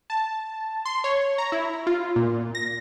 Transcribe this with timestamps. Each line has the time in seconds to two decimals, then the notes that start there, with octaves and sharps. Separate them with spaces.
0.10 A5
0.85 C6
1.04 C#5
1.38 A#5
1.52 E4
1.87 F4
2.16 A#2
2.55 A#6